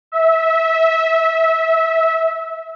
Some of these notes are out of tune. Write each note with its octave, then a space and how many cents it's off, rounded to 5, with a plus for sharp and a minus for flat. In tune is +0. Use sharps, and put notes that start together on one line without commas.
E5 -20